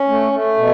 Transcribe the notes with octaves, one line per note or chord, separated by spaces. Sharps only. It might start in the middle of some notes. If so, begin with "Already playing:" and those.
Already playing: C#4
A3
A3
B2